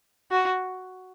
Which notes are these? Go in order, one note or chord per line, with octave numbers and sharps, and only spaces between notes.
F#4